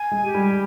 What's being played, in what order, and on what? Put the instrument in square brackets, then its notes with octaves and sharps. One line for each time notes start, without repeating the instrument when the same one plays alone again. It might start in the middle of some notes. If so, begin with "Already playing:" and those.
Already playing: [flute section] G#5
[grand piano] G#3
[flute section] G4
[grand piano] G3